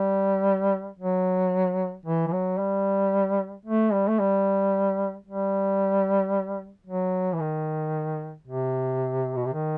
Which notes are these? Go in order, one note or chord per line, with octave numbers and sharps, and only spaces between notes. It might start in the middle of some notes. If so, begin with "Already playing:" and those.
Already playing: G3
F#3
E3
E3
F#3
G3
A3
G3
A3
G3
G3
F#3
E3
D#3
C3
B2
C3
D#3